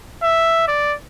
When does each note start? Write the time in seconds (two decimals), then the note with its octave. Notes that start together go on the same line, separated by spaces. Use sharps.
0.23 E5
0.68 D5